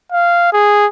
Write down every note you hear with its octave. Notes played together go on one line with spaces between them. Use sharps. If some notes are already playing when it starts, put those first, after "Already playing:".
F5
G#4